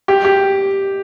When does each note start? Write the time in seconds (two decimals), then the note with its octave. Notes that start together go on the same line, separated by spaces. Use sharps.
0.08 G4
0.25 G4